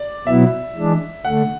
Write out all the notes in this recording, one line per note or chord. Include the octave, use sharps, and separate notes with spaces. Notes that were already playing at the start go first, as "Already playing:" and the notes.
Already playing: D5
B2 F#3 B3 E4 E5
E3 G#3 D4
D3 A3 F#5